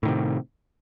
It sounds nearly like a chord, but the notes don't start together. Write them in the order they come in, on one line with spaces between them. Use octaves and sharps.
A2 D#3 C3